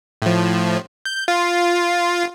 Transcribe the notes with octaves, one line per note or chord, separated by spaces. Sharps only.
A2 F3
G6
F4